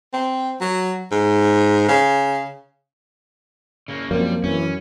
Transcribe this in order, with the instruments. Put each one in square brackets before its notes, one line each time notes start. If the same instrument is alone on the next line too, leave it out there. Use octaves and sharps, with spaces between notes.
[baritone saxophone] C4
F#3
G#2
C#3
[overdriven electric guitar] C#3 A#3
[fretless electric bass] F#2 [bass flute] F3 [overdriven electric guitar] G3 [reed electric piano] A#3 C4
[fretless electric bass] F#2 [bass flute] E3 [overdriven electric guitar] C#4